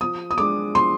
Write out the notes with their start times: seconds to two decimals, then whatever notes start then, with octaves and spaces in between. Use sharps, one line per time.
0.01 F3 D#6
0.31 D#6
0.38 G#3 D4 D6
0.75 F3 C6